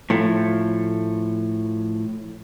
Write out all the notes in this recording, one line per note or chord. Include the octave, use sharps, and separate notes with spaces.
A2 F3 A3